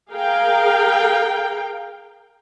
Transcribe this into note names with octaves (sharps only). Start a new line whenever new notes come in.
G#4 A#4 F5 G5